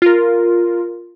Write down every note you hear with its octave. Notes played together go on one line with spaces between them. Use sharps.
F4 A#4